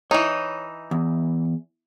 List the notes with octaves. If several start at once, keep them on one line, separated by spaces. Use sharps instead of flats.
E3 D#4 C#5
E2